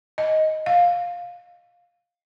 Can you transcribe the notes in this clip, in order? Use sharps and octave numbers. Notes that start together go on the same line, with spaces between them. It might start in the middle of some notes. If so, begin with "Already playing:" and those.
D#5
F5